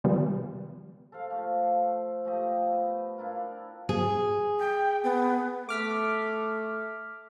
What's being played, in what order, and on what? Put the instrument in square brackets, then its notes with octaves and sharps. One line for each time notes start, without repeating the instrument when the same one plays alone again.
[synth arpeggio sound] C3 D#3 F3 G3 G#3 B3
[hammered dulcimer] A4 C5 F5
F3 A3
F3 A3 G4 D#5
B3
D4 E4 F4 A#4
[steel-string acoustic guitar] G#4
[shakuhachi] G5
B3
[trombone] A3 [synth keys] D6 F6 B6